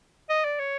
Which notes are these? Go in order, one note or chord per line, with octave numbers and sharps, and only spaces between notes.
D#5
D5
C#5